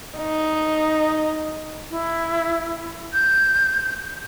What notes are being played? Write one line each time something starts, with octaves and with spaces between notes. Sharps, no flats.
D#4
E4
G6